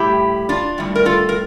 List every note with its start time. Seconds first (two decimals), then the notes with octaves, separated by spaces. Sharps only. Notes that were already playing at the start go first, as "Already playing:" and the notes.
Already playing: A2 G3 E4 G4
0.49 D4 F4
0.78 A2 G3
0.95 A#4
1.05 F4 A4
1.29 A#4